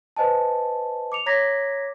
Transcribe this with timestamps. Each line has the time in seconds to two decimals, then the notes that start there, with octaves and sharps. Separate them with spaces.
0.16 B4 C5 D#5 G#5 A5
1.12 D6 C#7 F7
1.26 C#5 A#5 D6 G#6 A#6 B6